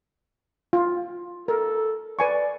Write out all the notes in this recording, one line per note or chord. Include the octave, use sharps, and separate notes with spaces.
F4
A4 A#4
B4 D5 G#5 C#6